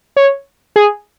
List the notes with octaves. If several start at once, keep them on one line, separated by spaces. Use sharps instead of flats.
C#5
G#4